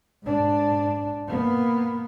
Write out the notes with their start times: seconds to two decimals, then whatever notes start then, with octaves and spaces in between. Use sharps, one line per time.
0.23 G#2 D4
1.27 A#3 B3